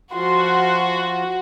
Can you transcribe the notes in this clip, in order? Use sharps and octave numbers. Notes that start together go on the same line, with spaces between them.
F3 F4 F#4 C6